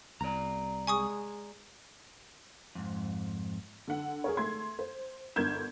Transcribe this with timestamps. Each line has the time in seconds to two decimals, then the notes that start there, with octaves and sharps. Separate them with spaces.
0.21 C2 D5 A#5
0.87 G#3 G#5 C#6 D#6
2.75 F2 G#2
3.87 D3 F#5
4.24 G#4 A#4 C#5
4.37 A3 C6 G#6
4.79 C5
5.36 G1 D3 A#4 G6 G#6 E7